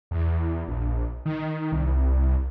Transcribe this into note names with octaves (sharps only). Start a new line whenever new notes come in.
E2
A#1
D#3
C2